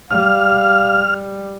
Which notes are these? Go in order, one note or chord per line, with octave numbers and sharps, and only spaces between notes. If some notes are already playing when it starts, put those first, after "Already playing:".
G3 F5 F6